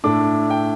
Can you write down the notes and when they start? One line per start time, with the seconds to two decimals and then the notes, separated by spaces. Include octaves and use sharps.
0.04 A2 A3 D4 D6
0.50 G5